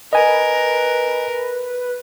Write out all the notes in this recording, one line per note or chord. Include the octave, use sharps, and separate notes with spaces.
A#4 B4 D#5 G#5